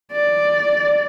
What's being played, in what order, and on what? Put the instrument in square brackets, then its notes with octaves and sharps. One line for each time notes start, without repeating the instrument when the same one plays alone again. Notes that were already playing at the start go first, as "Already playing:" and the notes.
[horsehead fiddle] D5